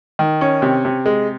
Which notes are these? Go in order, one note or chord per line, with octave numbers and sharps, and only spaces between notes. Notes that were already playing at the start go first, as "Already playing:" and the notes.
D#3
C#4
C3
C3
G#3